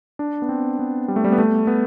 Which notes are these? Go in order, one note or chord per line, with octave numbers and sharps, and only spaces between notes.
D4
B3
C4
B3
G3
A3
G3
B3
A3
B3